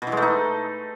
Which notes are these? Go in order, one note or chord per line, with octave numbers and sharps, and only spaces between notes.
B2
E3
G#3
A3
D#4